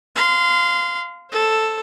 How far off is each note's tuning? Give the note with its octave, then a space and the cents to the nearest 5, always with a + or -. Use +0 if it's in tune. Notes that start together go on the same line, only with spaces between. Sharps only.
F5 +0 C6 -25
A4 +0 C5 +25